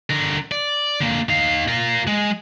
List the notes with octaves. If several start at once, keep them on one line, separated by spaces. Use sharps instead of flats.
D3 A#4
D5
D3 A#3
D#4 F5
F4 A#4
G#3